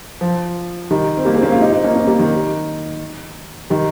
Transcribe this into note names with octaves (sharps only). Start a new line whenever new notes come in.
F3
D#3 G3
C4
G3 A#3
G#3 C4
A#3 C#4
F4 G#4
D#4 G4
C4 D#4
A#3 C#4
A#3 C#4
G3 A#3
D#3
D#3 G3